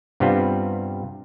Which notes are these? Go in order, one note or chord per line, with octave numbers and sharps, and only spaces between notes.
G2 C3 G3 B3 C4 F4